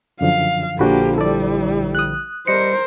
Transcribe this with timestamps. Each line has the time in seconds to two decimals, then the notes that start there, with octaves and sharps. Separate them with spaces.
0.21 F#2 D3 F3 F5
0.79 A#1 D3 F3 A#3 D4 F#4 G4 B5
1.18 G3 E4 A4 D5
1.95 D#6 F#6
2.47 G3 A#4 C5 D#5 C#7